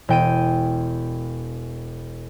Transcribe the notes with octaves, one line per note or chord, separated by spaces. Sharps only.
E1 G5 D#7